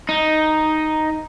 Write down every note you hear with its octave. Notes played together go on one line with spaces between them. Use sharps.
D#4